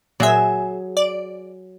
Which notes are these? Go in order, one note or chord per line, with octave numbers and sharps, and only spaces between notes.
A#2 F#3 G#4 E5
D5